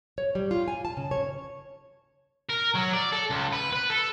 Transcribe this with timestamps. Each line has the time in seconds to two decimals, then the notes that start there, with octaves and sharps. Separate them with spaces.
0.18 C#5
0.35 G3
0.51 F4
0.68 G#5
0.85 A5
0.97 C#3
1.11 C#5
2.49 A#4
2.75 F#3
2.94 D5
3.12 A4
3.30 C#2
3.53 B4
3.73 B4
3.90 A4